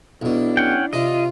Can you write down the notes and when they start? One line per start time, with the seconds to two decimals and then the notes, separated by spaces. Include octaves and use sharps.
0.22 B1 B2 D4 E4
0.57 C#4 F#5 G5
0.93 C3 D4 F4 D#5